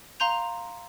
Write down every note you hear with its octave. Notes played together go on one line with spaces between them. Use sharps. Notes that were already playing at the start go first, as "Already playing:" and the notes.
F5 A#5 C6 G6 F7